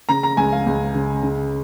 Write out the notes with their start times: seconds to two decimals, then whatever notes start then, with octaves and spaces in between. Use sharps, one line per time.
0.09 C#3 A#5
0.23 A#5
0.37 C#2 G#5
0.53 F5
0.67 C#2
0.95 C#3
1.23 C#3